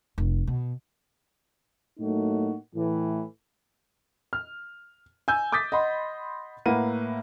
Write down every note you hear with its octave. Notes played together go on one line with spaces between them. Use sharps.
F1
B2
A2 F#3 A3 A#3 D#4 F#4
A2 E3
F6
G#5 E6 G6
D6 D#6 G6 A6 B6
D#5 F#5 B5 C6
A2 A#3 B4 F#5 D#7